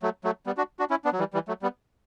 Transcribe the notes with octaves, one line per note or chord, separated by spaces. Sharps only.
F#3 A3
F#3 A3
G3 B3
D4 F#4
D4 F#4
C#4 E4
B3 D4
F#3
E3 G3
E3 G3
F#3 A3
G3 B3